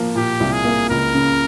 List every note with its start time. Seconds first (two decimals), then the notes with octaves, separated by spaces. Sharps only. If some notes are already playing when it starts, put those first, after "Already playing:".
Already playing: F3 A#3
0.15 A#2 G4
0.40 C2
0.53 G#4
0.65 A#3
0.90 C#2 A#4
1.14 C#3